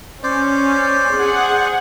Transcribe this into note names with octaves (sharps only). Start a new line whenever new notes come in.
C#4 C5 D5
G#4 F#5